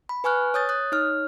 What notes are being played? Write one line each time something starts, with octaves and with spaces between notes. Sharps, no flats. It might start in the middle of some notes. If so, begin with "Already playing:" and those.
B5
B4 G#5 C#6 F6 F#6
C#5 D#6 G6 A6
D#6 F#6
D#4 C#5 F6